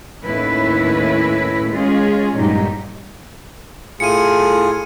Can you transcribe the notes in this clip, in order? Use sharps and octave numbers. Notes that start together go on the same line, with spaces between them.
D#2 A2 C#4 E4 B4
G#3 C#4 F4 G#4
G2 A#2 F#3 G#3 D#4 G4
A2 F4 G#4 C#7 D#7